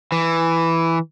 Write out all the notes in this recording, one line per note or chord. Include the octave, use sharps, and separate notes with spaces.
E3